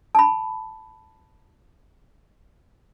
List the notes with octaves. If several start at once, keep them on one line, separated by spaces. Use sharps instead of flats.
A5 B5